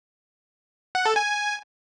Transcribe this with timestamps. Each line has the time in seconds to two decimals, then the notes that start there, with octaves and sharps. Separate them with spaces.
0.95 F#5
1.05 A4
1.16 G#5